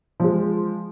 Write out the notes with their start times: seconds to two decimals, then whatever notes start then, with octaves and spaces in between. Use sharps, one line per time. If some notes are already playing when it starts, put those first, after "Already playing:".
0.20 F3 G#3